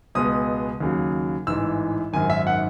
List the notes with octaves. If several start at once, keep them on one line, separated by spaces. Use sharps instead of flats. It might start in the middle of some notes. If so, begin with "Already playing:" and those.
C#2 B2 G#3 B3 D#6
D#2 C#3 F#3
A1 G#2 E3 E6
G#1 F#2 D#3 G#5
E5
F#5